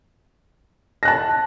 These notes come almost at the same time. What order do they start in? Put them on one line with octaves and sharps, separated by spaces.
A#6 F#6 A5